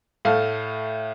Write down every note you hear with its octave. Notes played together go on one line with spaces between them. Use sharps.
A2 A3 A4 F5